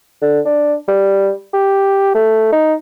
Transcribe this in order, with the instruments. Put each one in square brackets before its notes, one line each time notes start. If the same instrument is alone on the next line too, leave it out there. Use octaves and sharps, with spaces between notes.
[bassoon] D3
D4
G3
G4
A3
D#4